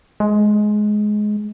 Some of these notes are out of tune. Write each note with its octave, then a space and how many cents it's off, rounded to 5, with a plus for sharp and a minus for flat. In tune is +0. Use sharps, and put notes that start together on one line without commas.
G#3 +15